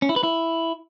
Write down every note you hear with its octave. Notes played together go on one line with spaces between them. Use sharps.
C#4
E4
B4
E4